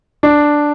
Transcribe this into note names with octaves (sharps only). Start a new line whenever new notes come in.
D4